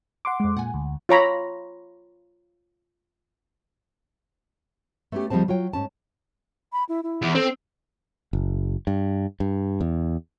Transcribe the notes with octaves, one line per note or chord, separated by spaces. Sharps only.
F#5 C6 D6
F2 G#3
A#2 F#5 G#5
D2
F4 C#5 A#5 B5
A3 B3 C#4 F4 G4
D2 F3 G3 G#3 C4 A5
F#3 F4 C#5 G5
G#2 C#4 A5
B5
E4
E4
E2
C4 A4
F#1
G2
G2
E2